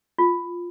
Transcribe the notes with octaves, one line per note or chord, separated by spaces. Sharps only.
F4